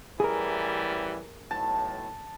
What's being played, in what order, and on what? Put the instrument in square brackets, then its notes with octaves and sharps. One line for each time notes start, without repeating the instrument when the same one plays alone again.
[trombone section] A1 E3 G3 [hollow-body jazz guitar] G#4 A#4
[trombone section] B1 A2 [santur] A5